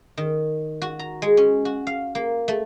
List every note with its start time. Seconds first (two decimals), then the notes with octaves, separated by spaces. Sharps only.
0.18 D#3
0.82 F#4
0.99 A#5
1.22 G#3
1.37 C#4
1.65 F#4
1.87 F5
2.15 A#3
2.48 A3